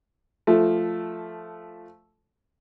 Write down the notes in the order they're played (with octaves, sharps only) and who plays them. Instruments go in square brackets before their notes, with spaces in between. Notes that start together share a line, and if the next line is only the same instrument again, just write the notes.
[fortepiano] F3 A3